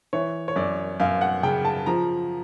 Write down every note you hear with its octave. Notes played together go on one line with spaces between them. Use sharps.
E3 C#5
C#5
F#2 D5
F#2 F5
F#5
C#3 G5
A5
F3 A#5